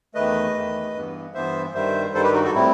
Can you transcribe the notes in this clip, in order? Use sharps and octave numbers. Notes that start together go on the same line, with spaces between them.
E2 D#3 A3 B4 D#5
E2 D#3 A3
G2 E3 B3
G2 E3 B3 C5 E5
G2 D#3 G3 C5 E5
G2 D#3 G3 A4 C5
G4 B4
D#4 F#4
F#4 A4
A2 G3 C4 E4